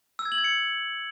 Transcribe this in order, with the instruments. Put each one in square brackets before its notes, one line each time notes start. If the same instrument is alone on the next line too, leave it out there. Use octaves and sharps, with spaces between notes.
[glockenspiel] E6
G#6
F#7
G#6
C#7